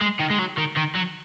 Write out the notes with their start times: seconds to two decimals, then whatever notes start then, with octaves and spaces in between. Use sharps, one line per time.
0.02 G#3
0.20 D#3
0.31 G#3
0.39 F#3
0.58 D#3
0.77 D#3
0.96 F#3